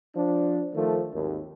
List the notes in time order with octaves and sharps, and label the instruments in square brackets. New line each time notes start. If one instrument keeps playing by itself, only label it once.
[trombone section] F3 D4
D#3 F3 A3
G#1 D#2